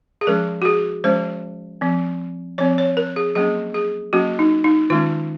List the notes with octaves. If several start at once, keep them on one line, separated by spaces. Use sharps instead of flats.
G#4
F3 G#3 C#4 A#4
F#4
G#4
F3 G#3 C#4 C5
F3 C4
F3 C4 C#5
C#5
A#4
G#4
F#3 A#3 C#4 G#4
G#4
F#3 A#3 C#4 F#4
D#4
D#4
D#3 G#3 C#4 F4